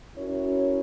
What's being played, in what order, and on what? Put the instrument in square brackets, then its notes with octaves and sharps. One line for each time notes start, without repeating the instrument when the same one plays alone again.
[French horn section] C#4 E4 F#4 A#4 C#5